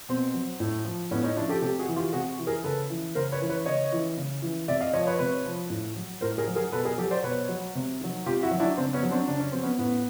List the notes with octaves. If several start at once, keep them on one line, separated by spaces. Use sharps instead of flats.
B2 C4
F#3
A2
F3
A2 B3 C#4
C#4 D#4
F3 D4 E4
G4 A4
C3 G4 A4
F#4 G#4
E3
F4 G4
C3 F#4 G#4
E3
G#4 A#4
C#3 A4 B4
E3
C#3 A#4 C5
B4 C#5
E3
B4 C#5
C#3 C#5 D#5
E3
C#3
E3
C3 D5 E5
D#5 F5
F3 C#5 D#5
B4 C#5
C3 B4 C#5
F3
A2
F#3
A2 A#4 C5
G#4 A#4
F#3
G#4 A#4
B2 A4 B4
G#4 A#4
F#3 G4 A4
C5 D5
B2 B4 C#5
F#3
C3
D#3 F#3
C3 F4 G4
E4 F#4
D#3 F#3
D4 E4
C#3 C4 D4
B3 C#4
F#3
C4 D4
C#3 D4
C#4
F#3 C4
B3 C#4
A2 B3